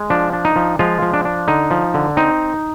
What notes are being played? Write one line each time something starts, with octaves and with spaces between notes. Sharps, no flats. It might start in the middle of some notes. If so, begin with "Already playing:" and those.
Already playing: G#3
F3 D4
D4
D#4
F3
F3 G#3 F4
F3
D4
D4
D3 D#4
F3
D3
C4 D#4